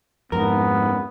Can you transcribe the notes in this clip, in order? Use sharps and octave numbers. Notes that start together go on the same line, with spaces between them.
F2 G#2 B3 A#4